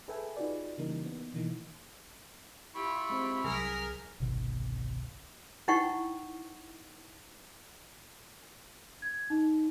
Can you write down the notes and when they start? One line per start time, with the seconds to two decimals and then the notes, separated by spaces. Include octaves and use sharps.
0.08 G#4 A4 B4 E5 G5 G#5
0.36 D#4 F4 F#4 G#4 B4 D5
0.78 C#3 E3 G3 A#3 D#4 A#4
1.06 B3
1.34 B2 D#3 E3 A#3 D#4
2.75 E4 F4 G4 B5 C#6
3.10 G#3 C4
3.44 C2 F#3 G#4 A#4 F6 B6
4.20 G1 C2 B2 D#3
5.68 D#4 E4 F#5 G5 C#6
9.02 G#6
9.30 D#4